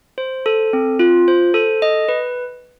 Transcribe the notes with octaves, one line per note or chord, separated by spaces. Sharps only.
C5
A4
C4
F4
C5
A4
D#5
B4